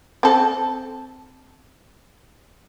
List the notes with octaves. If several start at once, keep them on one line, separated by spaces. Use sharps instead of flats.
C4 A4